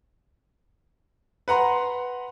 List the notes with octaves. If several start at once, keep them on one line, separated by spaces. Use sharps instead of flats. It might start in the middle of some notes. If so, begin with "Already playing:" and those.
B4 F#5 A#5 C6